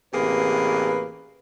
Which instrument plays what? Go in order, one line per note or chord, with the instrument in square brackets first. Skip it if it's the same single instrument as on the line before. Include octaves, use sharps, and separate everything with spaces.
[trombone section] A1 B4 [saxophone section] C3 A#3 G#4